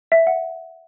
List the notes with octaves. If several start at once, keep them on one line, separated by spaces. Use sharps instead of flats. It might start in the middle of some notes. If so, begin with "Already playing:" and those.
E5
F#5